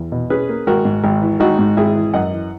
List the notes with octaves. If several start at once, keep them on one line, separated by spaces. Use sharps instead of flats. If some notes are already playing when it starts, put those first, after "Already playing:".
Already playing: E2
B2
C#4 G#4 B4
A#3
G#1 F#4 A#4
G#2
G#1
E3
G#1 D#4 F#4
G#2
G#1 E4 G#4
E3
F#2 D#5 F#5
E3